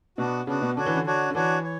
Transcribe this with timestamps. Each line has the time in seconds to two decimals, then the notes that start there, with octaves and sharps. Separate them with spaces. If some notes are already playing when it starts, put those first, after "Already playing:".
0.18 B2 B3 D4 F#4
0.47 C#3 B3 D4 F#4
0.62 B2
0.76 D3 D4 F#4 C#5
0.86 E3
0.96 D3
1.06 D4 F#4 C#5
1.30 D3
1.35 E3 D4 F#4 C#5
1.64 C#5